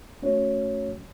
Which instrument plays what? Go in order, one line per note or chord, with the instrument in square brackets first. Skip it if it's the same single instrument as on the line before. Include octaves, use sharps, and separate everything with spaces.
[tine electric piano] A3 C#4 F#4 C#5